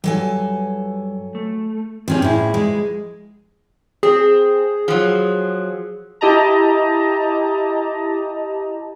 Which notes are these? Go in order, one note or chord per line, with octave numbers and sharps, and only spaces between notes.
G2 F#3 A4 G#5
A3
F3 C4 C#4 G4 G#4
A2 E4
G#3
C4 G#4
F3 F#3
E4 G4 D#5 A5 A#5